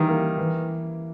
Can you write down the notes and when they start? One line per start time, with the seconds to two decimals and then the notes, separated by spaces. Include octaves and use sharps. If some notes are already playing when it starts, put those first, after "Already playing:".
Already playing: D#3 E3 G3
0.09 A#3
0.38 E3